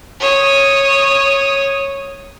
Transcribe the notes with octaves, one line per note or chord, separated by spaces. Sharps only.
C#5 D#6